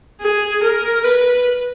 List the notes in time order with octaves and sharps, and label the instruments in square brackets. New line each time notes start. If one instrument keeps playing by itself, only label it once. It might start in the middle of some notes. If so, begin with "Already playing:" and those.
[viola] G#4
A#4
B4